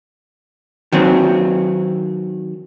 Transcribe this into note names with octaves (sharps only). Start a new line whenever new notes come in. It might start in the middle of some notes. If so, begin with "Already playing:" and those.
D#3 F#3 C4